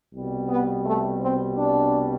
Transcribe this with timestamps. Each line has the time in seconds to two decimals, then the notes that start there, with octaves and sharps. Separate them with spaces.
0.12 C2 B2 G3
0.47 B3
0.83 A3
1.19 C4
1.55 D4